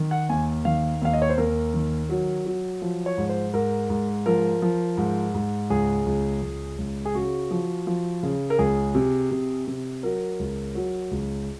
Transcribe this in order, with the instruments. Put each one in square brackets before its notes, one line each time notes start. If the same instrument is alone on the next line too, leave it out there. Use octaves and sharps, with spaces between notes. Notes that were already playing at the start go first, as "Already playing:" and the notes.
Already playing: [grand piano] D#3
F#5
D#2 G#5
D#3 F5
D#2 F5
D#5
C#5
C5
D#2 A#4
D#3
F#3
F#3
F3
C#5
G#2
C5
G#2 A#4
G#2
F3 A#4
F3
G#2
G#2
C#2 G#4
C#2
C#2
C#2
G#4
C#3 F#4
F3
F3
C#3
A#4
C#2 G#4
C3
C3
C3
F#3 A#4
C#2
F#3
C#2